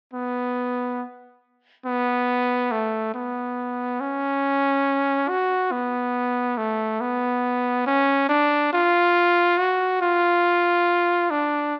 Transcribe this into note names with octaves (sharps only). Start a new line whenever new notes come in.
B3
B3
A3
B3
C#4
F#4
B3
A3
B3
C#4
D4
F4
F#4
F4
D4